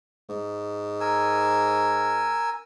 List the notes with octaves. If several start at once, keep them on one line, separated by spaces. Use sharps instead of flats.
G#2
A#4 G#5 E6